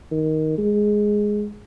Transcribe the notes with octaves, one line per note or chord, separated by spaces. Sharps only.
D#3
G#3